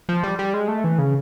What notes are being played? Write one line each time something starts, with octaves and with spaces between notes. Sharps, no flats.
F3
G3
G3
G#3
A3
E3
C#3